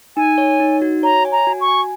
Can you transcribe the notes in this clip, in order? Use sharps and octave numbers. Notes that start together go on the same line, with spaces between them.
D#4 G#5
C#5
D#4
F#4
C#5 A#5
G#5
A#5
F#4
C#6
G#5